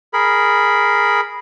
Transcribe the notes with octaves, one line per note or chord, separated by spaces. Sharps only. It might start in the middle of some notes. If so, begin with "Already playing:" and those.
G#4 A#4 B5